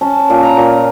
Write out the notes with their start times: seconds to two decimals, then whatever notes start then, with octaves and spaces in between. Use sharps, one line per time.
0.01 C#4 A5
0.30 A#2
0.43 A#5
0.57 A#2